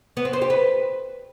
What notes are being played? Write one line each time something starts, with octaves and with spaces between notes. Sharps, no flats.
B3
C4
C5
G4
B4